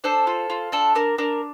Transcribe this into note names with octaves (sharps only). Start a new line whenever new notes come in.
D4 A4 C5
F4
F4
D4 A4
D4 A#4
D4 A#4